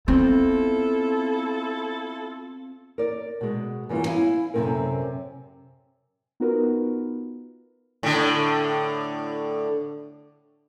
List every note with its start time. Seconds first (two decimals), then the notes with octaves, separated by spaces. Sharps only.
0.08 B3 C4 E4 F4 A4
2.98 A#4 D5
3.41 B2 G#3
3.89 F#2 E3 G3 B3 F4
4.07 E4 F5 G#5
4.54 F#2 C3 F3 C4 A4 A#4
6.40 B3 D#4 F4 F#4 A#4 B4
8.03 A2 D3